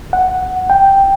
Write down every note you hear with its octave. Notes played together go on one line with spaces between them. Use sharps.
F#5
G5